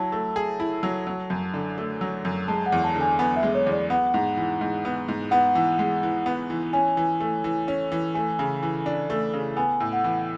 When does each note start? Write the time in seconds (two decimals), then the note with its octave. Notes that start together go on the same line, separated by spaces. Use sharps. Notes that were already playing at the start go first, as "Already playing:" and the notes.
Already playing: F#3 E4 A5
0.12 A3
0.36 G#4
0.60 E4
0.83 F#3
1.07 F#3
1.30 F#2
1.54 D3
1.78 A3
2.01 F#3
2.25 F#2
2.48 G#3 A5
2.66 F#5
2.72 E2
2.84 A5
2.96 D3
3.01 G#5
3.19 B3 G#5
3.36 E5
3.43 G#3
3.55 C#5
3.66 E2
3.72 D5
3.90 B3 F#5
4.14 G#2
4.37 E3
4.61 G#2
4.85 B3
5.08 G#2
5.31 B3 F#5
5.55 E3
5.79 G#3
6.03 E3
6.26 B3
6.50 E3
6.73 C#4 G#5
6.97 E3
7.20 A3
7.44 E3
7.68 C#4
7.92 E3
8.15 A3 G#5
8.39 C#3
8.63 E3
8.86 D4
9.10 A3
9.34 C#3
9.57 B3 G#5
9.80 A2
9.93 F#5
10.04 E3